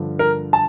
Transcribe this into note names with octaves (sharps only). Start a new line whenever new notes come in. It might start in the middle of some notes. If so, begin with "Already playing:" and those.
Already playing: G2 D3 F3
A#4
A5